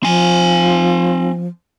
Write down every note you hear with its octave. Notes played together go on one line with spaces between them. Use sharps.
F3 C4 G#5